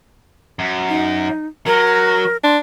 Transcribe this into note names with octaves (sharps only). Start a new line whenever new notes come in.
F#2
D#4
F#3 A#4
D4 C6